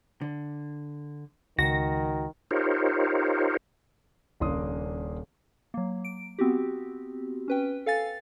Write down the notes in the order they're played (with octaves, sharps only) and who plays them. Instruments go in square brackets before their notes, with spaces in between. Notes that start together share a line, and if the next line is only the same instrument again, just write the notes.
[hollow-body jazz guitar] D3
[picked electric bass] C#2 [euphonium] D#3 [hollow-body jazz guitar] F#4 [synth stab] A#6
[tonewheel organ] D#4 F4 G4 A#4 C5 C#5
[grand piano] D#1 C#3 A#3 D4 C6 D#6
[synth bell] F#3 A#3
D7
B3 C4 F#4 G4
C#4 B4 G5
A4 F5 G#5 A6